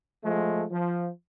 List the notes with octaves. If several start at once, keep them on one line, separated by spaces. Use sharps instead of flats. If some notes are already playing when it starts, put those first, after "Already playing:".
F3 G#3 A3
F3